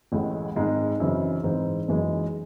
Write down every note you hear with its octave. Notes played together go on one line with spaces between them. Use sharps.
A1 A2 G#3
G#1 G#2 D#3 G#3 D#4
F#2 C#3 E3 C4 D#4
G#2 E3 C4
F#1 F#2 E3 G#3 D#4